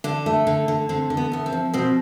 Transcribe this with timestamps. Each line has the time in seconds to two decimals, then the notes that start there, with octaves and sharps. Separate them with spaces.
0.04 D3 D4
0.26 A3
0.47 D3
0.68 D3
0.89 D3 C4
1.10 D3
1.17 B3
1.32 A3 B3
1.46 C4
1.52 F3
1.74 B2 C4